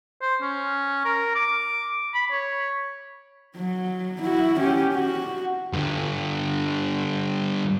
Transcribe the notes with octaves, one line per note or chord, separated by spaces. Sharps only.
C5
C#4
A#4
D6
B5
C#5
F#3
E4 F#4
C#4 G4
F#4
G2 D3